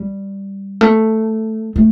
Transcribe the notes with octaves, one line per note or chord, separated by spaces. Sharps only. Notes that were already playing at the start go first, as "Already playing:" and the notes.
Already playing: G3
A3
A3